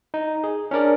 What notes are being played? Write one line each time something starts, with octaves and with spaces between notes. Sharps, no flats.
D#4
G#4
C#4 D4 A#4 D5